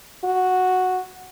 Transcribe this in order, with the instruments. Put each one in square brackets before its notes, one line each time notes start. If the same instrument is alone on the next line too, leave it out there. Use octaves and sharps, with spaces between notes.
[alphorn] F#4